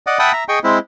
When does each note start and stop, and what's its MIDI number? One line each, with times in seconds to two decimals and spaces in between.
0.07 0.18 74
0.07 0.18 75
0.07 0.18 78
0.19 0.32 76
0.19 0.32 78
0.19 0.32 79
0.19 0.32 81
0.19 0.32 83
0.19 0.32 87
0.33 0.44 76
0.33 0.44 82
0.49 0.59 68
0.49 0.59 75
0.49 0.59 79
0.49 0.59 85
0.64 0.79 56
0.64 0.79 60
0.64 0.79 64